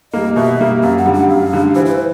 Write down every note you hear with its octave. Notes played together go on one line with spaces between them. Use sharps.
G3 A#3 D#5
B2 E5
G3 A#3
F#2 F5
F#5
D3 G3
F#5
F#2 F5
D3 G3
E3 C5
C5
B4